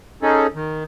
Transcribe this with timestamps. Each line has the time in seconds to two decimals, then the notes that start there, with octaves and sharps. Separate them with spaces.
0.22 C#4 D#4 G#4 A4
0.55 D#3